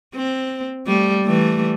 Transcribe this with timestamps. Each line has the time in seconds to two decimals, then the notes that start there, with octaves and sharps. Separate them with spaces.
0.15 C4
0.87 G3 A3
1.25 E3 G3 A3